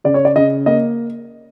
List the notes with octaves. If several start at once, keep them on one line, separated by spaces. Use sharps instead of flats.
C#3 D5
C#5
D5
C#3 D#5
A#3 D#5